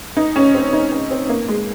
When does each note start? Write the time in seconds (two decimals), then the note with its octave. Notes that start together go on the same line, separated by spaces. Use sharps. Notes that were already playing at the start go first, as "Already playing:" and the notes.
0.17 D#4
0.36 C#4
0.54 C4
0.73 D#4
0.92 C#4
1.11 C4
1.29 A#3
1.48 G#3